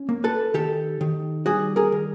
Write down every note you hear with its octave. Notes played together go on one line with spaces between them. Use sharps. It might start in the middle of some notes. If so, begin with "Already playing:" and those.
Already playing: C#4
A#3
A4 B4
D#3 G4 A4
D#3
G3 F#4 G#4
G#4 A#4
D#3